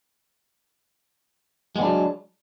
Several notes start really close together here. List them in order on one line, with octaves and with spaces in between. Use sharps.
G#3 B3 D4 F#3